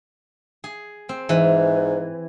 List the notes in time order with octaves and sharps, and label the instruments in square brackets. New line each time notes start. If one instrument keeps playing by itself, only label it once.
[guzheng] G#4
C4
[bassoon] G#2 [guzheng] E3